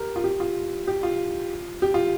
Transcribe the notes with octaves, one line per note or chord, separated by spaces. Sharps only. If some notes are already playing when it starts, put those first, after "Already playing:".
Already playing: G4 A#4
F4
G4
F4
G4
F4
G4
F4